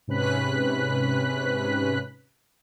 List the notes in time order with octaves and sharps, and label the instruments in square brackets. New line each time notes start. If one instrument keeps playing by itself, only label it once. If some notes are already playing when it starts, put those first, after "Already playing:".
[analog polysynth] G#2 C3 C#4 B4 F#6 B6